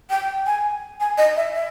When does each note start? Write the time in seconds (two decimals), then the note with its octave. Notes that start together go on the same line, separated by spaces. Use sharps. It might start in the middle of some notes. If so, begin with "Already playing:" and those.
0.10 G5
0.46 G#5
1.00 G#5
1.18 D#5
1.37 E5
1.54 E5